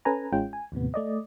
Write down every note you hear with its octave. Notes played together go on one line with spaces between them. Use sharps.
C#4 A4 B4 G#5 A#5
A1 G#3 C#4 F4 G5
G#5
D#2 A2 C3 B3
A3 D5 D#5